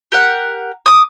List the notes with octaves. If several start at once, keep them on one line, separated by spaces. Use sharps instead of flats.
G4 A#4 F#5
D6 D#6